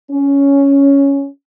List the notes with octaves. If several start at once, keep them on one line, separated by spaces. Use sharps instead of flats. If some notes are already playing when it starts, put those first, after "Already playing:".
C#4